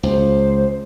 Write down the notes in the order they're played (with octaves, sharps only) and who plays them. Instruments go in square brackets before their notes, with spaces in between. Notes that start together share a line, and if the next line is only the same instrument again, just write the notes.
[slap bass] C#2 [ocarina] C5